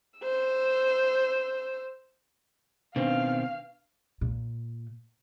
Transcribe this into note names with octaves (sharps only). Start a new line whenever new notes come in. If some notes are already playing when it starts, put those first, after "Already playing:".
C5 E6
B2 D#3 C4 D4 B4 F5
A#2